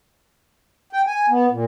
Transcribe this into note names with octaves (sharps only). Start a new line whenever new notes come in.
G5
G#5
B3
A#2